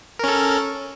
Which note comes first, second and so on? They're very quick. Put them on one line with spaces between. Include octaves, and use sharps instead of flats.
A#4 C#4 A4